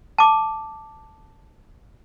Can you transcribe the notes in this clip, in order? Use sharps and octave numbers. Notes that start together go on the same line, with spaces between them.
A5 D6